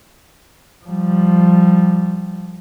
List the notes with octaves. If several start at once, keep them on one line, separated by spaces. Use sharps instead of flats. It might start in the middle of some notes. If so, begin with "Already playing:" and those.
F3 G3